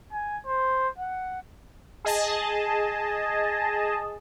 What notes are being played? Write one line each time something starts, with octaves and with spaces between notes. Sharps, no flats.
G#5
C5
F#5
G#4 D#5 A5